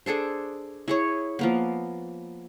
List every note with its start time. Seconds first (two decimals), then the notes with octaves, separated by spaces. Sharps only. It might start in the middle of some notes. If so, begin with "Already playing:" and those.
0.06 D4 G#4 A4 C5
0.88 E4 G#4 C#5
1.39 F3 A#3 B3